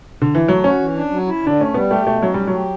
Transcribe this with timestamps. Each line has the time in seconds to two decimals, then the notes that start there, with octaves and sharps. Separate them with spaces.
0.22 D3
0.35 E3
0.48 F#3 A3
0.63 C#4 F#4
0.79 E3
0.95 D4
1.11 F#3
1.27 E4
1.43 D3 D4
1.59 A3 C#4
1.74 G3 B3
1.90 A3 G4
2.06 B2 A3
2.22 F#3 C#4
2.34 G3 A3
2.47 F#3
2.53 G4